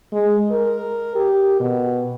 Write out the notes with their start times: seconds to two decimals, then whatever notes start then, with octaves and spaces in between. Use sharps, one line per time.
0.13 G#3
0.51 A#4
1.15 G4
1.60 B2